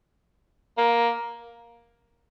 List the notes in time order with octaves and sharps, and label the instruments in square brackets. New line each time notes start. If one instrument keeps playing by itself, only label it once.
[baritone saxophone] A#3